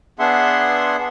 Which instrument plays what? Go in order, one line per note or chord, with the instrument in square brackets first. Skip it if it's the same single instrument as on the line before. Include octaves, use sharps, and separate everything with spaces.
[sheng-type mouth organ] B3 D4 G#4 E5 F#5 C6